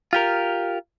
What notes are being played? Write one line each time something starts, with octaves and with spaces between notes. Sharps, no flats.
F4 G4 A#4